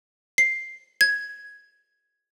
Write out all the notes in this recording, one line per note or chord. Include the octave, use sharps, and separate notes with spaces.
C7
G#6